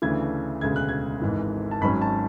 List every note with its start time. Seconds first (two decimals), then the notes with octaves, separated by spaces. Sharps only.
0.02 D2 C#3 E3 A3 D4 G#6
0.61 E1 D2 C#3 G#3 G#6
0.76 F#6
0.89 G#6
1.22 G#1 G#2 E3
1.71 A5
1.81 G#1 G#2 F#3 C#4 B5
2.02 A5